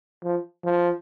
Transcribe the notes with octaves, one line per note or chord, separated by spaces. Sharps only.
F3
F3